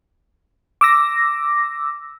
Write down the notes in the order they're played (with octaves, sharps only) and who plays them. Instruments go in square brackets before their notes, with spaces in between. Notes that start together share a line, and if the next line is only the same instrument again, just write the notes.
[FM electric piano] D6 E6 A#6